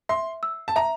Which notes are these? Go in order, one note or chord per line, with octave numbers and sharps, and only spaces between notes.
E5 C6
E6
A5
E5 A#5